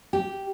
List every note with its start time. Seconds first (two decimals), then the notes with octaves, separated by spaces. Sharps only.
0.13 G4